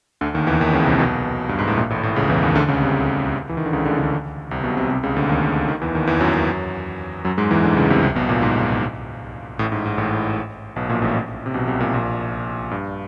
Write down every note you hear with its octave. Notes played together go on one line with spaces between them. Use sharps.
D2 D3
D#2 D#3
E2 E3
D#2 D#3
C#2 C#3
C2 C3
B1 B2
G2
G#2
A2
A#1 A#2
A1 A2
A1 A2
C#2 C#3
E2 E3
D#2 D#3
D2 D3
C#2 C#3
C2 C3
E3
D#3
D3
C#2 C#3
D2 D3
D2 D3
C2 C3
B1 B2
C2 C3
C2 C3
C#2 C#3
D2 D3
D#2 D#3
D#2 D#3
E2 E3
D#2 D#3
E2 E3
F#2 F#3
F#2 F#3
F#2 F#3
G#2 G#3
E2 E3
D2 D3
C#2 C#3
C2 C3
C2 C3
B1 B2
A#1 A#2
G#2
A1 A2
G#2
G#2
A1 A2
B1 B2
A#1 A#2
A1 A2
C3
B1 B2
C2 C3
A#1 A#2
A#1 A#2
G2